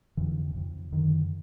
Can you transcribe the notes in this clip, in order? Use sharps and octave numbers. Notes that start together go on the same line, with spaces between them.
F2 D3 E3
F2 C#3
F#2 D3 D#3